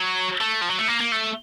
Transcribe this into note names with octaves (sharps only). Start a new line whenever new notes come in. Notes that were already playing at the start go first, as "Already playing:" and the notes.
Already playing: F#3
A3
F3
F#3
A3
A#3
A#3
A3